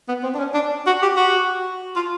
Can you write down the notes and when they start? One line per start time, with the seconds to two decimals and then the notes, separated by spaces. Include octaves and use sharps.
0.08 B3
0.23 C4
0.34 D4
0.39 C#4
0.54 D4
0.87 F#4
1.02 G4
1.17 F#4
1.96 F4